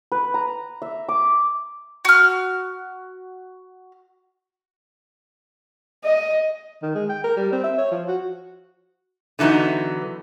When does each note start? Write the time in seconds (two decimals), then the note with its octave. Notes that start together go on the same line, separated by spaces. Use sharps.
0.12 B4
0.34 A#5
0.82 E5
1.09 D6
2.05 F#4 F6
6.04 D#5
6.82 D#3
6.95 G#3
7.09 G5
7.24 A#4
7.37 G3
7.52 C4
7.64 E5
7.78 C#5
7.91 F3
8.08 F#4
9.39 D3 E3 F#3 B3 D#4